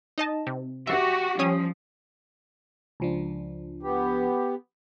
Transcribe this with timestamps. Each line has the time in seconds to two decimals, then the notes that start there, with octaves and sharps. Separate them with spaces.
0.18 D#4 D#5 A5
0.47 C3
0.87 F#4 G4 E5
1.39 F3 G3 C#4 D#6
3.00 C#2 F3 D4
3.83 B3 G4